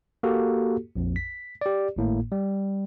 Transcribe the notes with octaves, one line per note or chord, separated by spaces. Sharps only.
A#3 F#4 G4 A4
A#1 F2
B6
G4 D5
G#1 A2 A#3
G3